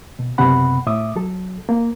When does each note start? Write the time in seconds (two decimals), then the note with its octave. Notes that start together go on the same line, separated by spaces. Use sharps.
0.19 B2
0.38 C#2 F#2 C3 B3 F#5 B5
0.87 A2 E5 D6 D#6
1.16 F#3 A4
1.69 A#3